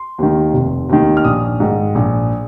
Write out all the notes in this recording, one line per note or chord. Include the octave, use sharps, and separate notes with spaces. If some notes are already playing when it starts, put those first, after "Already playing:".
Already playing: C6
D#2 D#3
F1
D#2 D#3
F6
A#1 D#6
G#2 D#3
A#1